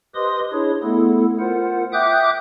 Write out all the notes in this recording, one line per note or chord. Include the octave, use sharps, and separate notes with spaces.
G4 B4 C5 D#5 C6 D#6
D4 E4 G#4 C#5
A3 B3 E4 A4
F4 A#4 C5 F#5
E5 G5 D6 D#6 F#6 G6